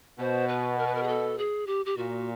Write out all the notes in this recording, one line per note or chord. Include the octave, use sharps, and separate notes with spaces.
B2 C5
B4
A#4
B4
A#4
G#4
A4
G#4
G4
G4
A#2 F#4